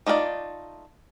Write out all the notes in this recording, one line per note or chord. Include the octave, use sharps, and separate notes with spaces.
A3 D#4 F4 A#4 D5